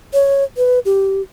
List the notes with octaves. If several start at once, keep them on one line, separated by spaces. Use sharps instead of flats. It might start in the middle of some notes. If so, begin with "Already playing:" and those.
C#5
B4
G4